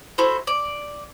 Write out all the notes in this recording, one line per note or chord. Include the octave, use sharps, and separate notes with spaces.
E4 F#4 A4 C5
D5